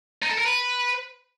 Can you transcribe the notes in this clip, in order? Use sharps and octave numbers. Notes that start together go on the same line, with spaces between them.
D#4
A4
A#4
B4